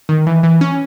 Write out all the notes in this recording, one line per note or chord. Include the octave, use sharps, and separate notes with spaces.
D#3
E3
E3
C#4